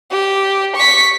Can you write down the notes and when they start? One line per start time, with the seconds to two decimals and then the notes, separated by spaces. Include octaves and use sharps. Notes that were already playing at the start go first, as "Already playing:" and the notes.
0.12 G4
0.77 C#6 B6